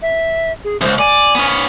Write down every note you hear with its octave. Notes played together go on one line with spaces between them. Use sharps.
E5
G#4
C#2 F#2 C5
D5 G#5
B3 C#4